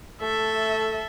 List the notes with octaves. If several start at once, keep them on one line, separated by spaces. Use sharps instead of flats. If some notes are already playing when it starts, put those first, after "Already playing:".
A3 A4 E5